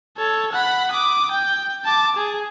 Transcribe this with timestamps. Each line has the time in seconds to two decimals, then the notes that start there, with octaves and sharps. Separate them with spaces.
0.17 A4 C#5
0.52 F#5 B5
0.91 D6 D#6
1.31 G5
1.85 A5 D6
2.16 G#4